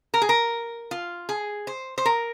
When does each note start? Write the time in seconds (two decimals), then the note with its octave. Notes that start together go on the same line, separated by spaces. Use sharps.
0.14 A#4
0.22 G#4
0.29 A#4
0.91 F4
1.29 G#4
1.67 C5
1.98 C5
2.05 A#4